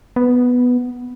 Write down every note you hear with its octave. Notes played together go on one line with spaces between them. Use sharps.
B3